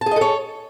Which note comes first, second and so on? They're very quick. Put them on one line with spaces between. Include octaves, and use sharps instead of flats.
A5 G#4 D#5 A4 C#5